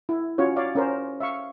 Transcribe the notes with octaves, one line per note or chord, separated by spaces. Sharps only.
E4
C#4 F4 F#4 C#5
C#5 D5 F5
C#4 A#4 C5
E5 F5 C#6